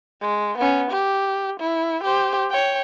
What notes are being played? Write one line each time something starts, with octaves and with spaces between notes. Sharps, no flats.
G#3
B3 C#4
G4
E4
G4 C5
C#5 G5